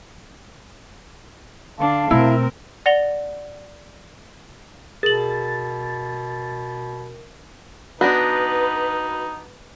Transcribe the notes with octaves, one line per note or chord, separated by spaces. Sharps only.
D3 D4 F5 A5
B2 A3 C4 E4 A#4
D5 F#5 A#6 C#7 F7 G7
B2 G#4 A#4 A6 F#7
B3 D4 D#4 F#4 B4 A#6